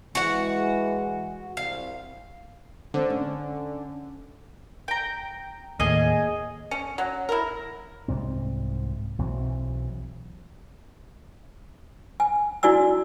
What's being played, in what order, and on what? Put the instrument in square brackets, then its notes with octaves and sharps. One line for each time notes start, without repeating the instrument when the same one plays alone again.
[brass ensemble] E3 G#3 [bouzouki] F#4 F#5
[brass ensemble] C2 [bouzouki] F5
[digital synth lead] D3 [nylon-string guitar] C4
[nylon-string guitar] C#4
[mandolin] G5 A#5
[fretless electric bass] D#2 A2 [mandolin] G#4 D#5
[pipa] C#4
F#3
E4 A#4
[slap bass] C2 G#2 C4
B1 E3 F#3 C4
[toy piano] G#5
E4 F#4 D5 G#5 E6